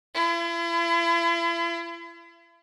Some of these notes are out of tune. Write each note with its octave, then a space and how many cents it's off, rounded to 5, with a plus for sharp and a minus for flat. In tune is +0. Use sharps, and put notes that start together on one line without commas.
E4 +40